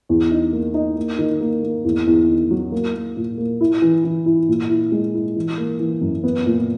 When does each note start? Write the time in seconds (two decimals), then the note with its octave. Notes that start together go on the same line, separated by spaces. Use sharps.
0.09 E2
0.31 D#4
0.53 A#3
0.74 D#4
0.97 A#3
1.18 D#3
1.41 A#3
1.63 A#3
1.84 E2
2.07 E2
2.29 D#3
2.51 F#3
2.72 A#3
2.95 A#3
3.17 A#2
3.38 A#3
3.61 E4
3.82 E3
4.04 E3
4.26 E4
4.48 A#2
4.70 E4
4.92 G#3
5.14 E4
5.36 E3
5.58 A#3
5.80 E3
6.01 F#2
6.24 B3
6.46 A#2